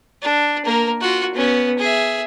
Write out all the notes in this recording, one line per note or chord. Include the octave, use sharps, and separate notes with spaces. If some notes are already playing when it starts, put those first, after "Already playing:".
D4
A#3 A#4
F4 F#4
B3 C#4
G#4 E5